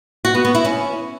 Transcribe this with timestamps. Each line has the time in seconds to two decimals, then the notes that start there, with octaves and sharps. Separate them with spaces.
0.25 F#4
0.35 B3
0.45 B3
0.55 E4
0.65 C#4